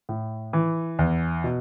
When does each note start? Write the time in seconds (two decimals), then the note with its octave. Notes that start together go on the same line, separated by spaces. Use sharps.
0.09 A2
0.53 E3
0.99 E2
1.44 B2